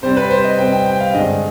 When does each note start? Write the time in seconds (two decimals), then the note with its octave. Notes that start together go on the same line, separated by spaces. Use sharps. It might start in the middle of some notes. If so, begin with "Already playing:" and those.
0.02 C3 G3 C4 C5
0.17 B4
0.31 C5
0.44 D#5
0.58 C3 G3 C4 G5
0.72 G5
0.86 G5
1.00 F5
1.14 G2 D3 G#3 D4 D#5